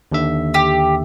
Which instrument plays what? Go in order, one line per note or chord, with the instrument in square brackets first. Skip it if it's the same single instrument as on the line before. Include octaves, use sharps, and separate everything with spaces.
[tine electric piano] D#2 D3 E5
[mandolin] G4